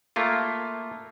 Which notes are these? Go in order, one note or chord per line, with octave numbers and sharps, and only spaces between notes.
A3 A#3 F4